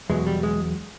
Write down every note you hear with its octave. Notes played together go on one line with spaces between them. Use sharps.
E2 B2 F#3 G#3
G3
G#3